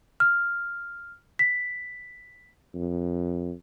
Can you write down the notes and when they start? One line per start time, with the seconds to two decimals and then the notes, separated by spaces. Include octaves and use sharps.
0.20 F6
1.39 B6
2.75 F2